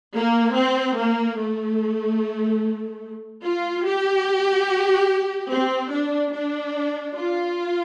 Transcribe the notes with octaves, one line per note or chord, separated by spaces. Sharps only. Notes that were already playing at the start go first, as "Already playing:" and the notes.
A#3
C4
A#3
A3
F4
G4
C4
D4
D4
F4